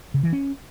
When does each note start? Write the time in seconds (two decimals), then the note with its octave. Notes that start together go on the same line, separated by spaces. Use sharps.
0.14 C#3
0.23 E3
0.33 C#4